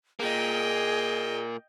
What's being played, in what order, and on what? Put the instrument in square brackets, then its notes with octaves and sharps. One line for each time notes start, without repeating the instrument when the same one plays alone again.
[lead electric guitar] A#2 A#3 [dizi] G#4 [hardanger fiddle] D#5 G5